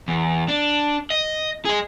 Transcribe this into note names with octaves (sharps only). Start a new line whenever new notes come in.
E2
D4
D#5
G#4 D#5